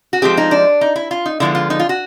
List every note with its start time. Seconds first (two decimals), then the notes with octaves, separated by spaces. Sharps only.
0.13 F#4
0.22 F3 G#3 C4 G4
0.37 D#4
0.51 D4
0.81 D#4
0.96 E4
1.11 F4
1.26 D#4
1.40 D3 F3 G#3 B3 E4
1.55 F4
1.70 D#4
1.79 F4
1.89 F#4